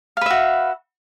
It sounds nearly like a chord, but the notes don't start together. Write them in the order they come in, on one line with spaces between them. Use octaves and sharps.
F5 B4 E5 F#4